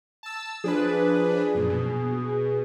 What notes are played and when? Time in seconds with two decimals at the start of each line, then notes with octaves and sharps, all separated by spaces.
0.23 A5 E6
0.64 F3 D4 G#4 B4
1.55 F#2 A#2
1.70 B2